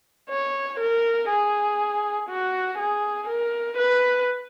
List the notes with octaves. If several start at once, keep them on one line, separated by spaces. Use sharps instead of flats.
C#5
A#4
G#4
F#4
G#4
A#4
B4